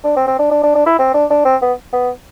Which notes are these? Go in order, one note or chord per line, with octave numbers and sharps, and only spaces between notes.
D4
C4
C4
D4
D4
D4
D4
E4
C4
D4
D4
C4
B3
B3